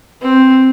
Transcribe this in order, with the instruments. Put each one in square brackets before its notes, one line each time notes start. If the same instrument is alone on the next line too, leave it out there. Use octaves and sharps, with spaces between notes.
[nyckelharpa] C4